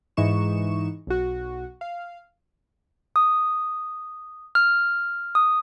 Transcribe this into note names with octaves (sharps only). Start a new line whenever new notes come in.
G#2 E3 D#4 C#6 E7
B1 F#4
F5
D#6
F6
D#6